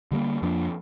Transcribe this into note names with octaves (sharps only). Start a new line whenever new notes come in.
D3 G3 A#3
F2 F3 A#3 D4